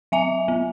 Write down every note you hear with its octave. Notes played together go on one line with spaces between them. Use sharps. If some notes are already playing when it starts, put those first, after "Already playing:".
F#3 E5 G#5
B3